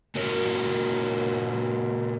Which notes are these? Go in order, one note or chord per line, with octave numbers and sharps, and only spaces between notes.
A#2 F#4 A#4 C#5